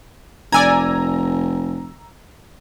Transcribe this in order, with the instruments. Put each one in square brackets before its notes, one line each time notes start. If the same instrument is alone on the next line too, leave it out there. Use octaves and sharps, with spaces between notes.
[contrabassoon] F1 [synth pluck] D5 G#5 G#6 [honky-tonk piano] A#5 E6